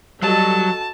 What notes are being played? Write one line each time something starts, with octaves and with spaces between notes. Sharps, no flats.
F#3 G3 F#4 A4 D#5 A5